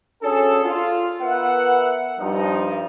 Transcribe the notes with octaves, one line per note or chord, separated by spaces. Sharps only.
C#4 D4 F#4 G#4 A4
F4
B3 A#4 B4 E5 F#5
G2 F3 D#4